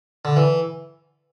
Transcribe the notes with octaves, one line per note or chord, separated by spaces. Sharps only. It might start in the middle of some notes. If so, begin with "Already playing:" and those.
D3
E3